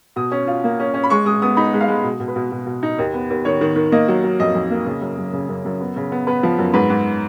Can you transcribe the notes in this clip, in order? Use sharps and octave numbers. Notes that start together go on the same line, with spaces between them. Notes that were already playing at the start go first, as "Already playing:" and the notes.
B2 D#6
C#4
F4
A#3
C#4
C#4
B5
G#3 C#6
G#3 D#6
B3 D#6
D#4 B5
G#3
F5
G#3
B2
B2
B4
B2
B2
B2
D#4
D#2
B3
D#2
D#3 C#5
D#3
D#3
A#3 D#5
F#3
F#3
F2 D#5
F2
A#3
C#3
F#2
F#2
C#3
F#2
F#2
B3
C#3
B3
B3 B4
F3
F#2
G#2 B4
G#2